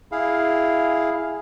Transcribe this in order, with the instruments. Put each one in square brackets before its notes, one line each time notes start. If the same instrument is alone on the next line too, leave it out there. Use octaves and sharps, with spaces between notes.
[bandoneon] E4 G#4 F5